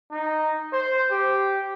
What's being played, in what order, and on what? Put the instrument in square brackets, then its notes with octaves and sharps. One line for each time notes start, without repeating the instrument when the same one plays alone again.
[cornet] D#4
C5
G4